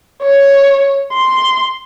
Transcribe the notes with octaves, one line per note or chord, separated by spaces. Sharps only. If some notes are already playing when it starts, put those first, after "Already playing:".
C#5
C6